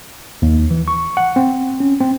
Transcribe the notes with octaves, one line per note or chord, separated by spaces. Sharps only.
D#2
E3
C#6
F#5
C4
C#4
C4